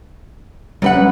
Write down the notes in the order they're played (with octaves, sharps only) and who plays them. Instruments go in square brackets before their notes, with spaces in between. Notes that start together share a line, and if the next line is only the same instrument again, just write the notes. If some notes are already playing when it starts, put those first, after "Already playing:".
[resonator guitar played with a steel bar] F#2 B4 F#5 [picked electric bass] F#3 G3 C#4